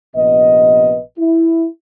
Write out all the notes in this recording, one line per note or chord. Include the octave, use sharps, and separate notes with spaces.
A#1 C3 B3 B4 D#5
E4